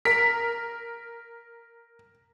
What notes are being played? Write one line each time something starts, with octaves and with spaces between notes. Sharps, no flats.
A#4 B6